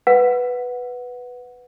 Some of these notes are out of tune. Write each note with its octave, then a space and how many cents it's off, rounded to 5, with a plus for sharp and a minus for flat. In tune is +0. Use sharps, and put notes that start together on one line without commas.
B4 +0 F#5 -10